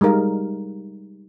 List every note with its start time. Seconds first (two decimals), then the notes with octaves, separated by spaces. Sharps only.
0.01 G3 G#3 D#4 A#4 F5